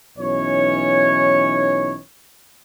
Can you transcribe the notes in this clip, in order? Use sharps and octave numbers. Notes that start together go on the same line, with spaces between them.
B1 E3 C#4 D#4 C#5